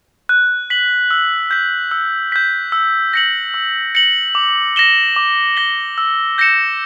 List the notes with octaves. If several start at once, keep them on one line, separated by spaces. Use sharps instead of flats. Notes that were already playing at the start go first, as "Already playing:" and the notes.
F#6
B6 F#7
E6
G6 B6
E6
G6 B6
E6
A#6 C#7 F#7
E6
A#6 C#7 F#7
D6
A#6 E7 G7
D6
A#6 E7 G7
E6
G6 A#6 C#7 E7